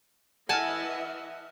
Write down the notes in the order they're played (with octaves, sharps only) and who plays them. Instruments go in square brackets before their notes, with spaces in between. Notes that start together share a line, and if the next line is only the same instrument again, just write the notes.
[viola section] E3 D#5 E5 [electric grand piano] F#5 F6 [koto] G#5 A5